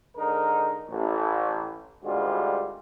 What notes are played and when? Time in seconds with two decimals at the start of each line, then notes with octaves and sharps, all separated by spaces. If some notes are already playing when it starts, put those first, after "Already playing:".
0.17 G#2 D3 D#4 A#4
0.90 A1
2.03 G#1 D2 G3 G#3 F4 F#4